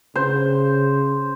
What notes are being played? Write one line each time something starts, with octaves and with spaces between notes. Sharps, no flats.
C#3 C5